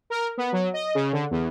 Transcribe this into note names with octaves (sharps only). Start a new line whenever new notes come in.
A#4
B3
F#3
D#5
C#3
D3
E2